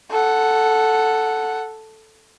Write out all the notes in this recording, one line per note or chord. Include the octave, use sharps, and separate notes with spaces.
A4 F#5